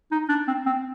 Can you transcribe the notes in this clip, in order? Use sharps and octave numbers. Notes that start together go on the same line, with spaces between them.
D#4
D4
C4
C4